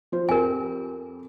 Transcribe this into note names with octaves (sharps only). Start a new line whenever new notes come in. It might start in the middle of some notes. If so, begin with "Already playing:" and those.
F3 F4 C5
F2 G4 A#4 G#5